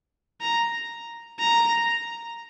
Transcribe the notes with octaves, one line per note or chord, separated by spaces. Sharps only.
A#5
A#5